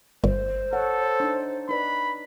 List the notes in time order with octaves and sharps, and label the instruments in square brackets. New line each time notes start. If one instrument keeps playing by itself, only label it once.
[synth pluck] G1 [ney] C5
[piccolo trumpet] A4 [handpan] C#5 F#5
[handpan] D4 D#4
[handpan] D#4 B4 D5 [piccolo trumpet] B5